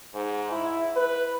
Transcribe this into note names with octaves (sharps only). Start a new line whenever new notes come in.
G#2
E4
B4